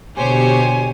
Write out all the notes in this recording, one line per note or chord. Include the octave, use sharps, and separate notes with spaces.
B2 D3 G4 C5 C#5 G#5